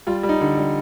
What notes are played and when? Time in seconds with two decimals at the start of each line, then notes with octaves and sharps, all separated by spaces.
0.07 G3 F4
0.23 G3
0.29 D#4
0.41 D3
0.58 G3